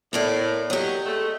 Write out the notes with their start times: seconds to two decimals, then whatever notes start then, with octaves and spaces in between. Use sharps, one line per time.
0.13 A2 B3 A#4 D5
0.70 F#3 G4 D#5
1.06 G#3 A3